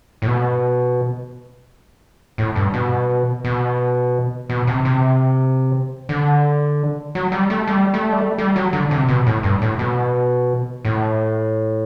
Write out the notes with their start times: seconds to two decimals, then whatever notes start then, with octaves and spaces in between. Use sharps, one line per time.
0.22 A2
0.27 B2
2.38 A2
2.56 G2
2.74 B2
3.44 B2
4.49 B2
4.67 C3
4.85 C3
6.09 D3
7.15 F#3
7.32 G3
7.50 A3
7.68 G3
7.94 A3
8.12 G3
8.20 A3
8.38 G3
8.56 F#3
8.73 D3
8.91 C3
9.08 B2
9.26 A2
9.43 G2
9.62 A2
9.79 B2
10.85 A2